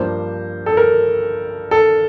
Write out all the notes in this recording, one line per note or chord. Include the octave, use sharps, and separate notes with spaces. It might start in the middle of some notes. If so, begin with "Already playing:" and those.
Already playing: G2 F3 A#3 D4 C5
A4
A#4
A4